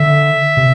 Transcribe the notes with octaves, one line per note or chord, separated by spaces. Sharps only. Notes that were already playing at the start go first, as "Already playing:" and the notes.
Already playing: D3 E5
C3